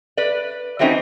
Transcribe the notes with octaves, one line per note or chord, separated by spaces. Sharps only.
B4 D5
E3 F#3 A3 C4 C#4 D#4